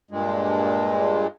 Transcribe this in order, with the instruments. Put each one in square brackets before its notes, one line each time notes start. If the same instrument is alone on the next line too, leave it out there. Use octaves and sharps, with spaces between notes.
[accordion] G2 A#2 G#3